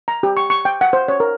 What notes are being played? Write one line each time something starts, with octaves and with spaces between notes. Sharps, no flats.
A#5
G4
C#6
C#6
G5
F#5
C5
C#5
A#4